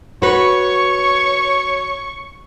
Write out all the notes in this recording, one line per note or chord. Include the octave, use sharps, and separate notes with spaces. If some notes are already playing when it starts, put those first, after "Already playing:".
F#4 B4 C#5 C#6